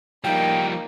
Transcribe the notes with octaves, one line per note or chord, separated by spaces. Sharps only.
F3 G3 A#3 D#4 G5